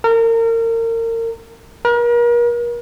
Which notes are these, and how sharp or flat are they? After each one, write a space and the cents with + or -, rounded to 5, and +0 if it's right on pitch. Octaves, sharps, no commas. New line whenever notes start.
A#4 -30
A#4 +40